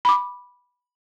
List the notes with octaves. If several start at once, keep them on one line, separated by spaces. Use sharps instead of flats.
B5 D6